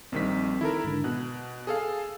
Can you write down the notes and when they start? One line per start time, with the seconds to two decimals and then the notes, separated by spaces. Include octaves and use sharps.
0.12 A#1 D#3 G3 C4 B6
0.61 D#3 E4 A4 A#4
0.84 G#2 D3
1.04 B2 F#6
1.67 G#4 A4 F5